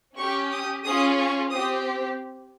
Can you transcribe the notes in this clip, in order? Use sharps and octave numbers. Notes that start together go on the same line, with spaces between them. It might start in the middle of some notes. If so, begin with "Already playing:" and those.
C#4 G4 C#6
D#6
C#4 F4 G#4 D#6
C#6
C4 G4 D#6